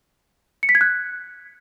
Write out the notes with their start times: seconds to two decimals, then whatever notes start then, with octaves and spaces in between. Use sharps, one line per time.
0.63 C#7
0.69 B6
0.75 G#6
0.81 F#6